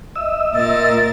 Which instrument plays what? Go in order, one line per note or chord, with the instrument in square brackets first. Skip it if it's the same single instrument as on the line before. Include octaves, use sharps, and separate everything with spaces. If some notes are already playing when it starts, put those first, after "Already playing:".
[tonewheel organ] D#5 E5 E6
[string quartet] A#2 A#4 A6